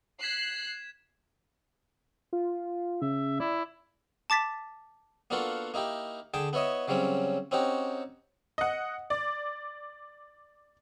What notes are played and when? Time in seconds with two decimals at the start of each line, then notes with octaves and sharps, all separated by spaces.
0.22 F#6 G#6 B6 C7 E7
2.33 F4
3.02 C#3 E5
3.40 E4 D5
4.30 A5 D6 A6 B6
5.30 A#3 B3 D4 F4 F#4 A4
5.74 A#3 D#4 E4 G4
6.34 D3 G#4 G5 A5
6.53 B3 E4 C#5 D#5 E5
6.88 C#3 F#3 G3 C4 C#4
7.51 C4 C#4 D#4 F#4 G4
8.58 D#5 F#5
9.10 D5